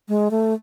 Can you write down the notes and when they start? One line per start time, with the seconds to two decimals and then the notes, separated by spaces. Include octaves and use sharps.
0.08 G#3
0.31 A3